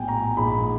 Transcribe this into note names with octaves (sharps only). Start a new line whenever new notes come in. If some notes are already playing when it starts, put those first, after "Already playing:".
Already playing: A#1 A2 B3 G5 G#5
A#5
A#1 G#2 F3 B5